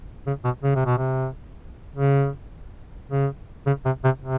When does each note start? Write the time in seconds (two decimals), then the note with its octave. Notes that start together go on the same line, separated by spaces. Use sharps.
0.27 C#3
0.44 B2
0.63 C#3
0.75 C3
0.86 B2
0.97 C3
1.95 C#3
3.09 C#3
3.66 C#3
3.85 C3
4.04 C3
4.22 C3